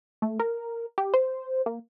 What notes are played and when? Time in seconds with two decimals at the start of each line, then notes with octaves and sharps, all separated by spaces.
0.22 A3
0.40 A#4
0.98 G4
1.14 C5
1.66 A#3